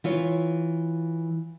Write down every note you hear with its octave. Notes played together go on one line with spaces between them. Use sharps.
E3 F4 C#5